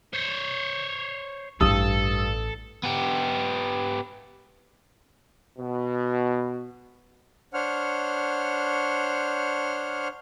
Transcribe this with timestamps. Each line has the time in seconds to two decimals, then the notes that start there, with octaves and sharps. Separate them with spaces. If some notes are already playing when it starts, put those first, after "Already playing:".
0.13 C5 C#5
1.61 A1 G2 E4 A4 D#6 E6
2.83 B3 G4
5.59 B2
7.54 D4 C5 C#5 F#5 F6